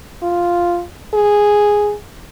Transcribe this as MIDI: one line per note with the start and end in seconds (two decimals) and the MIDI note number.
0.23 0.83 65
1.13 1.95 68